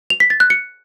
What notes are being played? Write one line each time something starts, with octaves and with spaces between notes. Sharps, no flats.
F7
B6
A6
F#6
C#7